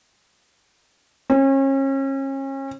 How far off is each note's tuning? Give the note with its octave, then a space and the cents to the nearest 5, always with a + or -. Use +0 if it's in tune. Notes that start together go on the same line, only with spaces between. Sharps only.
C#4 -35